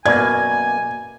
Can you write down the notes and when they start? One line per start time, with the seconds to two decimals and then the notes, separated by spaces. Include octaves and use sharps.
0.06 F#2 B2 A#3 D5 G#5 G#6